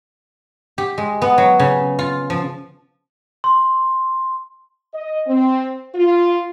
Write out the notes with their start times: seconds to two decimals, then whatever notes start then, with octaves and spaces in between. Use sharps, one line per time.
0.78 G4
0.98 G#3
1.22 B3
1.38 F#3
1.59 C#3
1.99 F4
2.30 F3
3.44 C6
4.93 D#5
5.26 C4
5.95 F4